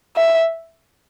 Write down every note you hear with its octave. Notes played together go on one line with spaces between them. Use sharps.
E5